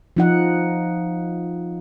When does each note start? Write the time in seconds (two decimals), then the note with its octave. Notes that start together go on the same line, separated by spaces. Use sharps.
0.17 F3 D#4 F#5